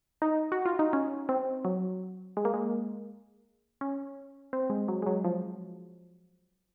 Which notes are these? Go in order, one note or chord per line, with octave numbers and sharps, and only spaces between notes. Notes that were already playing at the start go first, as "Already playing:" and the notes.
D#4
F#4
F4
D#4
C#4
C4
F#3
G#3
A#3
G#3
C#4
C4
G#3
F#3
G#3
F#3
F3